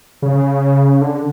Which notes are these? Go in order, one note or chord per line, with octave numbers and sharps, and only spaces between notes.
C#3
D3